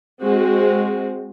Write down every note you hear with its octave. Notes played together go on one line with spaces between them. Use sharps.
G#3 C4 F#4